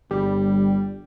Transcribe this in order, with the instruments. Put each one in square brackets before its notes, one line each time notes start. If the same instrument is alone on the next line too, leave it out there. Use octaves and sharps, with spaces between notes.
[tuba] G1 [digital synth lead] G3